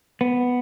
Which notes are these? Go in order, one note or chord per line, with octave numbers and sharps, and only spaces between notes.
B3